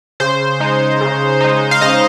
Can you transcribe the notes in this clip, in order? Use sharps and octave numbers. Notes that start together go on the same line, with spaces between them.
C#3 C5
G#3 D#4
C#3
G#3 D#4
F5
C#3 D#5